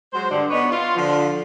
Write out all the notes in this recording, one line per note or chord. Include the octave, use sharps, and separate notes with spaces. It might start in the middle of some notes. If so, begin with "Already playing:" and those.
F#3 G#3 C5
G2 D3
B3 D4 D#4 B4 C#5
F4
D3 F3